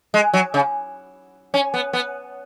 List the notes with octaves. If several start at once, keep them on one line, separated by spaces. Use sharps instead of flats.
G#3
F#3
C#3
C#4
B3
B3